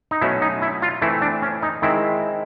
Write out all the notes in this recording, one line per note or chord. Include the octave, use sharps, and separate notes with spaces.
D#4
B2 F#3 A3 C#4 E4
D#4
E4
F4
E3 A3 C4 E4
D4
C#4
D#4
D#3 G#3 C4 E4